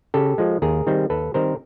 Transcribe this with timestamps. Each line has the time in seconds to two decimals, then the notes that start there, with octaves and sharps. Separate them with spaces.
0.14 C#3 G4 A4
0.38 F3 G#3
0.62 D#2 G#4 A#4
0.87 D#3 G3 C4
1.10 D#2 A4 B4
1.34 D#3 G3 C4 A#4 C5